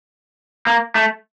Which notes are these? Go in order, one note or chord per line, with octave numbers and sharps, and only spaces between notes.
A#3
A3